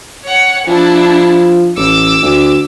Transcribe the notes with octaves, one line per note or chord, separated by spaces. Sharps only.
C#5 F#5
F3 D4 E4
A1 D6 E6
D2